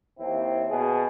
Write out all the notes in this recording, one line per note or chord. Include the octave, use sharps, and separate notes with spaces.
D#2 C4 E4
B2 G#4